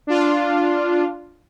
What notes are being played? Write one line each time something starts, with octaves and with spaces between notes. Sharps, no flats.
D4 F4